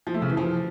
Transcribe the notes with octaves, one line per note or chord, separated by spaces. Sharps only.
F3
A3
C#3
E3
F3